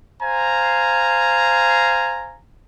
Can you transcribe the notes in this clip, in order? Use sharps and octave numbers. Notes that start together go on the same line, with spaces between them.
C5 F5 G#5 A#5